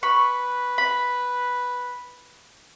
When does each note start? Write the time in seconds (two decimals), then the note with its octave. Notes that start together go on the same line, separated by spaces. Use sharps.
0.03 B4 B5 C#6
0.78 B5